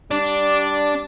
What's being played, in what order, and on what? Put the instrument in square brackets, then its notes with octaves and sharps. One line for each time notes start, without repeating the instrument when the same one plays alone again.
[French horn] G3 [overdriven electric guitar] D4 [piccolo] D6